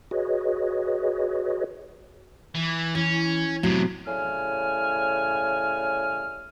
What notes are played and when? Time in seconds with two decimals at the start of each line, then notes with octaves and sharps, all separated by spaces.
0.11 F#4 G#4 B4 C#5 D#5
2.55 E3
2.95 E3 C#4
3.63 A2 C3 F#3 B3
4.07 A2 C#3 G3 G#5 F6